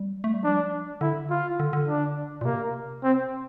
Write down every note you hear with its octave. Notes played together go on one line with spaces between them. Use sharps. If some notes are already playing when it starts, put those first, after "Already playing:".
Already playing: G3
A3
G3
F3 D4
D3 E4
F4
D3
D3
D4
A#2
C3 A#3
C4